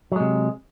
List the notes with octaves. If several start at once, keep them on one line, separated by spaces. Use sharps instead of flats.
C3 F#3 G#3